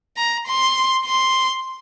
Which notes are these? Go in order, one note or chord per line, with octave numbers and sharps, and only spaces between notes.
A#5
C6
C6